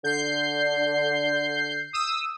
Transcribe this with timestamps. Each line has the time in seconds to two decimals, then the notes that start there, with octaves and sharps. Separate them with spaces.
0.04 D3 G6 C7
1.93 D#6 E6